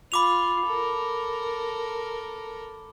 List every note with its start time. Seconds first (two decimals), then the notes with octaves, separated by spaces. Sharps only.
0.12 F4 B5 D6 F7
0.66 A4 A#4